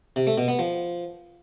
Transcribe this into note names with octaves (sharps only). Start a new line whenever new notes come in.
C3
A3
B2
B3
F3